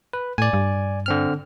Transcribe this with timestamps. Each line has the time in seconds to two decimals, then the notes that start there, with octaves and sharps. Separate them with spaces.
0.13 B4
0.38 A2 D5 G#5
0.53 G2
1.06 D3 C4 F6